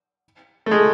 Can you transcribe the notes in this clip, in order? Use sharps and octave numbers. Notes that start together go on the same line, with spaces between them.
A3
G#3